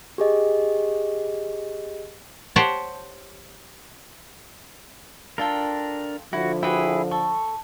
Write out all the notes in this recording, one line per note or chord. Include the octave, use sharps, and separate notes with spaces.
G4 G#4 D#5
G4 C5 C#5 F#5 G5 A5
D4 F4 A4 A#4 G5
D3 F3 E4 F#4
E4 F#4 G#4 B4 G5
A4 C#6